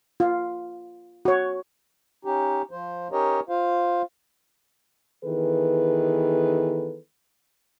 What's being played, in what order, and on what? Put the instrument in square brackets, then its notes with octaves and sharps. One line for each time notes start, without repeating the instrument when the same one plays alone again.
[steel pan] F4
F#4 C#5
[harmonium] C#4 D#4 G4
F3 C5
C#4 D#4 G4 A#4 C#5 D#5
F4 C5 F5
[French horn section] D#3 E3 B3 G#4 A4 B4